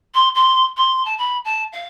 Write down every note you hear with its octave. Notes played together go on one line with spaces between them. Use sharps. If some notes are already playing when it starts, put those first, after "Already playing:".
C6
C6
C6
A5
B5
A5
F5